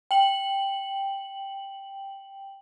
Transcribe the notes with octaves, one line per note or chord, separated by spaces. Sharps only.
G5 F#7